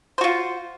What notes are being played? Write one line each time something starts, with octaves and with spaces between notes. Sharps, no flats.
F4 F#4 C5